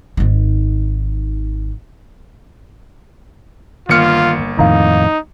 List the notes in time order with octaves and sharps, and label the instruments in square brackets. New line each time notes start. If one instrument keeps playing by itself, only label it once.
[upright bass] G#1 D#3
[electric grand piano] G1 A#3 C#7 [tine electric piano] D#3 F6 [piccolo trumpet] F4
[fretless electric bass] F2 A2 D#3 [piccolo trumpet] D#4 [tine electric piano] F5 A#5